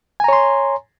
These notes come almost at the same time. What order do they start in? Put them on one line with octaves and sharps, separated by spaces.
G#5 A#5 C#5 C6